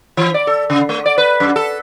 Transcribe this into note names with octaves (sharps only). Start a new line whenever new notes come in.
E3
D5
A4
C#3
A3
D5
B4
F#2
A4